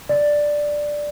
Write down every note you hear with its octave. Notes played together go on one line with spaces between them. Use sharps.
D5